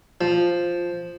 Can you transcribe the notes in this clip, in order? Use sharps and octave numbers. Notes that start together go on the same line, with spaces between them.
F3